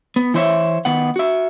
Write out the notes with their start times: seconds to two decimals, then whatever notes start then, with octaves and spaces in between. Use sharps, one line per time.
0.16 B3
0.34 E3 E4 C5 C#5 D#5 E5
0.85 D#3 B3 F#5
1.16 F#4 E5